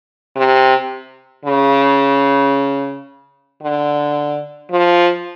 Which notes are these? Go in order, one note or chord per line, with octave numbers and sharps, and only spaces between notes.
C3
C#3
D3
F3